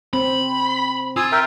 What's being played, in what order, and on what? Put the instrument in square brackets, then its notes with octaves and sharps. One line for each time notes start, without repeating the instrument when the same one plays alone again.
[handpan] C4 [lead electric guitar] B5
[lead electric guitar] F4 [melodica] G#5 D#6 E6
[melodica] A#4 E5 G5